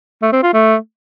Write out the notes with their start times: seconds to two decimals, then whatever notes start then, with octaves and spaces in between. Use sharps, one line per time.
0.22 A3
0.32 C4
0.43 F4
0.53 A3